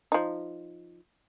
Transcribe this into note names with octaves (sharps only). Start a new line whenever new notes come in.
F3 D#4